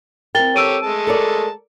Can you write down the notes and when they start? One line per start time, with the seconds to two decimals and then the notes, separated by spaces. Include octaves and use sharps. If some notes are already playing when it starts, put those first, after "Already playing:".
0.35 C4 E4 A#4 G5 A6 G7
0.56 G4 A4 C#5 E6 D7 D#7
0.83 G#3 A3 A5
1.07 A4 A#4 D5